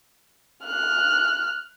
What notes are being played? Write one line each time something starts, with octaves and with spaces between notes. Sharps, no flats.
F6 F#6